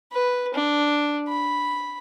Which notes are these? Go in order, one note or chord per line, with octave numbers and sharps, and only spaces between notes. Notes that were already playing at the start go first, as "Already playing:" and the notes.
B4
D4
B5